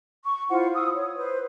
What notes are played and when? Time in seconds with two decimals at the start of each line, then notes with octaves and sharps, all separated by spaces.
0.25 C#6
0.49 E4 F4 C5 F#5
0.75 D#6 E6
0.94 C#5
1.15 B4 C5